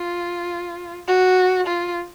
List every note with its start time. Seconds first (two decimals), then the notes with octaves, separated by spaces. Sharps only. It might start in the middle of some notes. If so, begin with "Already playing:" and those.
Already playing: F4
1.08 F#4
1.66 F4